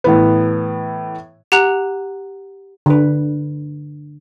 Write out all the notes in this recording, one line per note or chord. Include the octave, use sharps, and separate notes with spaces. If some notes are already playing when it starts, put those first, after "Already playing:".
A2 E3 B3
G4 F#5 A#5 F#6 F7
D3 B4